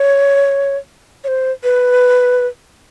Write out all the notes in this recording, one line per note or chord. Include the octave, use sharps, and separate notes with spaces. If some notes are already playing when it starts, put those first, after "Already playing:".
Already playing: C#5
C#5
C5
B4